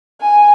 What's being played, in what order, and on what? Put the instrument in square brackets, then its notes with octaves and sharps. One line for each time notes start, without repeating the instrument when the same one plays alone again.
[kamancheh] G#5